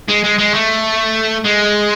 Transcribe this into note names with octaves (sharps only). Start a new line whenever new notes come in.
G#3
G#3
G#3
A3
G#3